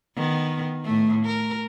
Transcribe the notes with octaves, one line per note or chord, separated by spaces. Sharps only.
D#3 B3
A2 A3
A#4